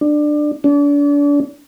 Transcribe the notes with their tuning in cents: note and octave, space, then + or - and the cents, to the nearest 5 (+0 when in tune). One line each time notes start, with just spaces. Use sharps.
D4 +20
D4 -35